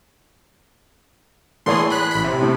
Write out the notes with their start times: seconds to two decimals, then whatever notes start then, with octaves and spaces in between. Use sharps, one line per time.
1.66 A2 E3 G#4 C#5 C6
1.90 B5 F#6
2.11 A1 B5
2.24 C3
2.42 A2